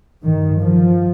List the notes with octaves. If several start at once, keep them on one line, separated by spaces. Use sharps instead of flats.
G2 D#3
F3